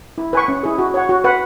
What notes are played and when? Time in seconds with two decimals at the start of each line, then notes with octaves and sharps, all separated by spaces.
0.18 E4
0.33 B4 G#5 C#6
0.48 C#4
0.63 E4 G#4
0.78 F#4
0.94 C#5 F#5
1.09 F#4
1.24 B4 F#5